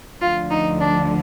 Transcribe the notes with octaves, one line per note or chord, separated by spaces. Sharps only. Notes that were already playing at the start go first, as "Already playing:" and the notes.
D2 D3 F3 F4
D#4
D4